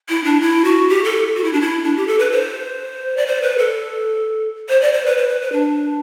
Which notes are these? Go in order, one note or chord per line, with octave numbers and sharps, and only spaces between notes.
E4
D4
E4
F#4
G4
A4
F#4
E4
D4
E4
D4
G4
A4
B4
C5
D5
C5
B4
A4
C5
D5
C5
B4
C5
B4
B4
D4